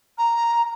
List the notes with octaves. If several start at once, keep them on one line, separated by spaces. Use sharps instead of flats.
A#5